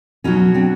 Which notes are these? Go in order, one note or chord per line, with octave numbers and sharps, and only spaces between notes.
B2 F#3 C#4 D#4
C4 D4